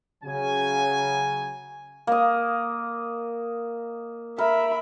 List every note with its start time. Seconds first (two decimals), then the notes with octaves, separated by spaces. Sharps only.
0.24 C#3 F#3 G#5
2.07 A#3 D#5
4.38 A#4 E5 B5